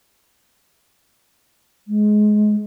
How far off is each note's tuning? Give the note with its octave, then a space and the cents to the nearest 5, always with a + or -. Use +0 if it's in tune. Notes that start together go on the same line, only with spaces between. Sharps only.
G#3 +20